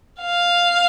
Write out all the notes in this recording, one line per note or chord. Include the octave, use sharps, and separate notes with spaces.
F5